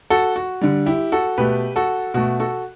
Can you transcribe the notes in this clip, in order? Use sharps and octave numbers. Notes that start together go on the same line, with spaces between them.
F#4 A4
F#4
D3 G3
E4 G4
F#4 A4
B2 A3 G4 B4
F#4 A4
B2 A3 F#4
F#4 A4